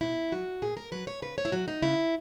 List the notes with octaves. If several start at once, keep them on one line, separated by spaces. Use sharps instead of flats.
B2 E4
F#3 F#4
A#2 G#4
A#4
F#3 B4
C#5
C#3 B4
C#5
E4
F#3 F#4
D#4
C#3 E4